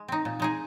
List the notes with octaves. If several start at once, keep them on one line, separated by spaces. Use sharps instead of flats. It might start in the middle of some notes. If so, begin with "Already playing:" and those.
Already playing: G#3
C4 D#4
A#2
G#3 D#4 G#4